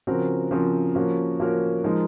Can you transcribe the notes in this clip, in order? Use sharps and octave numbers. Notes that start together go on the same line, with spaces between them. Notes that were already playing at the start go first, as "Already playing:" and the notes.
C#3 F3 C4 F#4 A#4
C#3 F3 C4 F#4 A#4
F3 A#3 C#4 F#4 A#4
F3 A#3 C#4 F#4 A#4
F3 G#3 D#4 A#4